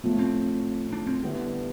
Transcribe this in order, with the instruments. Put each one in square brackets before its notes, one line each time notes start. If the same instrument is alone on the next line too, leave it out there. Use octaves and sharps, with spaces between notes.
[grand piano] A2 F3 A3 [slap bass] B3
[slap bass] C4
D4
C4
[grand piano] D3 G3 B3 E4